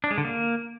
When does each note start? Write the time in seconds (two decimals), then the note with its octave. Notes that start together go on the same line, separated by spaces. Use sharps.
0.04 D4
0.11 G#3
0.18 D3
0.25 A#3